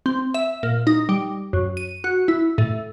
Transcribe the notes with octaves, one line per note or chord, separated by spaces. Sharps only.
C4
E5
A#2
D#4
G3
F#2
D#7
F#4
E4
A2